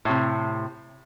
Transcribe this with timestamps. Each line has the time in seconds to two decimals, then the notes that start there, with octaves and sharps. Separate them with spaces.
0.05 A2 C3